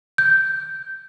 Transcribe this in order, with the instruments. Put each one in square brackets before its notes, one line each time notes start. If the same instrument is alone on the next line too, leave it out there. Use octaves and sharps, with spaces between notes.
[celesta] G6